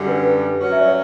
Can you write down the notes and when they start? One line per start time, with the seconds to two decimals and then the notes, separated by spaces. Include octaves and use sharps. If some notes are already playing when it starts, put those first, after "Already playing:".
Already playing: F#2 D3 G3
0.09 B4
0.61 F#3 C#4 F#4
0.72 E5
0.80 D5
0.88 C#5